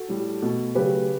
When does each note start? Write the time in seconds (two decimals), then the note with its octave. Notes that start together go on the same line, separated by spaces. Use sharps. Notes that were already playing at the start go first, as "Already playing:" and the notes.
Already playing: F#4 A4
0.09 A2 G3
0.42 B2 A3
0.75 C#3 F#3 A3 G4 B4